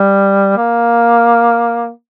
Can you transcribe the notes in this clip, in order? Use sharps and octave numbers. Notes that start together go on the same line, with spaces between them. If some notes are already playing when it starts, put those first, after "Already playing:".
Already playing: G3
A#3